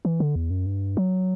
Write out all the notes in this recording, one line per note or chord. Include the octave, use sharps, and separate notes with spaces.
E3
D3
E2
F#2
G2
F#3